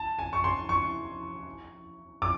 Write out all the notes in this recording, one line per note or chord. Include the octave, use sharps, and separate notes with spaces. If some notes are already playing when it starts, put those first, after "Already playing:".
Already playing: A5
G#5
C#6
C6
C#6
D6